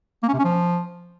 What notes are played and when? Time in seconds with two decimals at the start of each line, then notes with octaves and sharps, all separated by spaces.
0.23 A#3
0.28 C#4
0.33 C3
0.39 C#4
0.44 F3